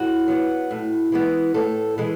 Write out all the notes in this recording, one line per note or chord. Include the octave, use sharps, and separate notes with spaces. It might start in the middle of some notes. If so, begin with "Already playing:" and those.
Already playing: A2 F#4
F#3 B3
A2
E3 G#3 B3
A2 A4
E3 G#3